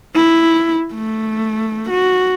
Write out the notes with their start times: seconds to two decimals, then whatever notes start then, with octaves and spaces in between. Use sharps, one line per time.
0.15 E4
0.94 A3
1.90 F#4